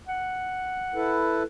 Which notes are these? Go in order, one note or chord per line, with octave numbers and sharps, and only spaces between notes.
F#5
E4 A4 B4